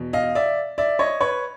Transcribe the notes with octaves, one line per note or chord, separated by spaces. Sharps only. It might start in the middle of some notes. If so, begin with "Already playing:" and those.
Already playing: E2 B2
D#5 F5
D5 E5
D5 E5
C#5 D#5
B4 C#5